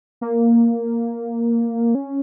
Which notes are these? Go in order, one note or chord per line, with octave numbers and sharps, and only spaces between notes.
A#3
C#4